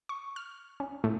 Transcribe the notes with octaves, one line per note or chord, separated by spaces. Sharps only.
C#6
F6
C#4
A2